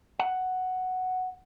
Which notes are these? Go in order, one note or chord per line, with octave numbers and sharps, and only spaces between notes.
F#5